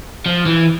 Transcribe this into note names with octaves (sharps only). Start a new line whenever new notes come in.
F3
E3